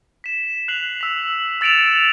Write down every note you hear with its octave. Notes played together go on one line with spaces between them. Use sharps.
B6 E7
F#6 C7 F7 F#7
E6 B6
E6 A6 C#7 D7 E7 F7